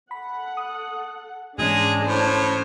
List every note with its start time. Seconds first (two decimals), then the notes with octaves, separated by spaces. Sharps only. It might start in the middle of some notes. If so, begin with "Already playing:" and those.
0.11 A4 F#5 B5
0.57 D#6
1.58 G#2 E3 G#3 C#4 D4 G#4 A5
2.05 A2 C5 C#5